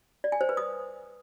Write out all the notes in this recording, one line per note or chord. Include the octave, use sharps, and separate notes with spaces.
D5
G#5
C5
B4
D#6